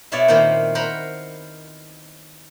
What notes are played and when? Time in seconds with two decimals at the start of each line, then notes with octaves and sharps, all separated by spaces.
0.12 B2 E4 C#5 D5 E5 F5
0.28 A#2 D#3 A#3 C4 E4 C5
0.75 A#4 C5 F#5 A#5 B5